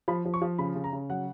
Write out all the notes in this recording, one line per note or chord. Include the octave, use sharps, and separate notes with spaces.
F3 B5
F3
C#6
F3
C#3 B5
C#3
A#5
C#3
F#3 F#5